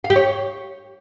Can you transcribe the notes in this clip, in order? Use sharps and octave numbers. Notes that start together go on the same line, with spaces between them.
F5
G4
C#5